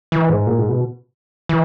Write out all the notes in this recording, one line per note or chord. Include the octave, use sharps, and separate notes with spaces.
E3
G#2
A#2
G#2
B2
E3